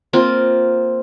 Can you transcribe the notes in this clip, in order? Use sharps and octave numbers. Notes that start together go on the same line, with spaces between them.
A#3 C4 F4